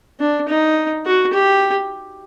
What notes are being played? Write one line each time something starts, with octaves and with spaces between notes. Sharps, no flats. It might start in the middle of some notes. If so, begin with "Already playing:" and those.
D4
D#4
F#4
G4